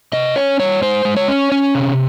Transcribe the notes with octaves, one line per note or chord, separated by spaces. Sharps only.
C3 D#5
C#4 C#5
G3 C#5
G#3 C5
G#3
C#5
C#4
C#4
C3